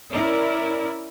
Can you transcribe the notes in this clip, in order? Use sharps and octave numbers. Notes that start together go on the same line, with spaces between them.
C#4 E4 A#4 D5